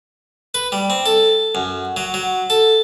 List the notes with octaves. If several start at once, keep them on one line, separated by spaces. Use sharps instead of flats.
B4
G3
C4
A4
F#2
F#3
F#3
A4